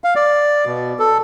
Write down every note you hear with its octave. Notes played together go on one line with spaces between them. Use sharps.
F5
D5
B2
A4